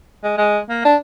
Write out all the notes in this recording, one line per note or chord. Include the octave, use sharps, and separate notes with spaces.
G#3
G#3
A#3
D4